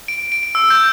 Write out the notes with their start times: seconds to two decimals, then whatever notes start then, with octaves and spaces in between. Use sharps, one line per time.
0.08 D7
0.32 D7
0.43 D7
0.55 E6
0.70 G6